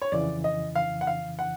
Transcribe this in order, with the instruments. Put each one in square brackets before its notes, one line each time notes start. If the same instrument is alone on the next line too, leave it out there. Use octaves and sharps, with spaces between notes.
[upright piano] C#5
[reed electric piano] F2 C#3 E3 [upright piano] D5
[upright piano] D#5
F5
F#5
F5
F#5